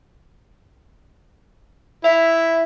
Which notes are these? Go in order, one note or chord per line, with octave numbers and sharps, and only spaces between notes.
E4 E5